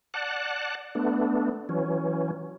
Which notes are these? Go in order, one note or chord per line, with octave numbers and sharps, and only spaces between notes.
D5 F#5 A5 F#6
A3 B3 D4
E3 F#3 C#4